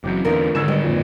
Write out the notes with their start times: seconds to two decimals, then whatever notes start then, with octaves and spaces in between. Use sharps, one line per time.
0.04 F#1 E3 F#3 C4 D6 G6
0.25 E2 D3 D#4 F4 A#4
0.55 G#2 D3 D#3 E6 G#6 E7
0.68 G3 B3 D#5
0.82 G#1 F2 A#2